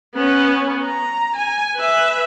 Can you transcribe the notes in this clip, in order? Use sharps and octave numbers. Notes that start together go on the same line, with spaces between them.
B3 C#4
A#5
G#5
B4 E5